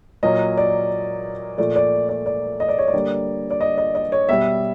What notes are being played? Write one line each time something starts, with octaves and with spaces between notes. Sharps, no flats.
A#2 F#3 A#3 D#5
D5
A#2 F3 A3 D5
D5
D5
D5
D#5
D5
C#5
D5
D3 G3 A#3
D5
D#5
D#5
D#5
C#5
B2 G3 B3 E5